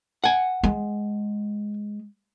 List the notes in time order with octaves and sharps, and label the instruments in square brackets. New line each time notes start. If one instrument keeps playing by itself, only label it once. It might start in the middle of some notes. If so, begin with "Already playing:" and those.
[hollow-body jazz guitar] F#5 G#5
[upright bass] G#3